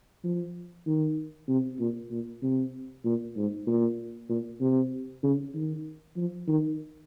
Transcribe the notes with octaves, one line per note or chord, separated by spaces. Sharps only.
F3
D#3
C3
A#2
A#2
C3
A#2
G#2
A#2
A#2
C3
C#3
D#3
F3
D#3